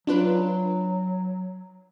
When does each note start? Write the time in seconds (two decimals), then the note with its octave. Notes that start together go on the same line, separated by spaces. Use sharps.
0.07 F#3 D4 F4 B4